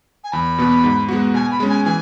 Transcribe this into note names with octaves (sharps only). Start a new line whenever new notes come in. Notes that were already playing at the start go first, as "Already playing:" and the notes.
G#5
E2 B5
B2 B3
G#2
G#3 B3 F#4
B2 G#5
B5
G#3 C#4
G#5
E3 G#5